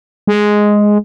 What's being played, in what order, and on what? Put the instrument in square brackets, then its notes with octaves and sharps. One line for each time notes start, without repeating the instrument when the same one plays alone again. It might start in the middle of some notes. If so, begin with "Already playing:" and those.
[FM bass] G#3